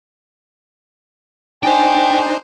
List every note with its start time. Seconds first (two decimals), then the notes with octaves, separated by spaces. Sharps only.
1.63 D4 D#4 A4 C5 G5 G#5